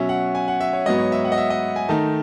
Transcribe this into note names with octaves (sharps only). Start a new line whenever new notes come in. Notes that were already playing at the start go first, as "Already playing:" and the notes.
Already playing: B2 F#3 C#4 E5
F#5
G#5
F#5
E5
C#5
G#2 F#3 B3 D#5
C#5
E5
F#5
D#5
E5
D#5
G#5
D#3 A3 D#4 A5